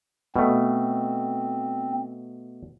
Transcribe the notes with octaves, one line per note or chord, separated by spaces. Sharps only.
B2 A3 C4